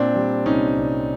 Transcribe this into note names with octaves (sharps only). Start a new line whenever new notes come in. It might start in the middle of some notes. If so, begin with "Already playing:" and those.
Already playing: A#2 C4 D4
G3
C2 C#4 D#4
C2